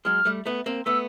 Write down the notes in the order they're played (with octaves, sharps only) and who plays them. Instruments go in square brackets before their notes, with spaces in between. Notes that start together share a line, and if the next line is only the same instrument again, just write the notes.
[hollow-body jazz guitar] F#3 G#3 [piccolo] F6
[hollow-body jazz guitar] G3 A3
A3 B3
A#3 C4
[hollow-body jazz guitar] A3 B3 [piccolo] E6